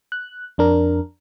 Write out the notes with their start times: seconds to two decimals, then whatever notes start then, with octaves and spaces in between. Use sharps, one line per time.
0.12 F#6
0.58 F2 D4 A#4